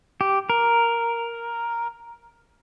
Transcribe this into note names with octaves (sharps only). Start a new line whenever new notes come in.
G4
A#4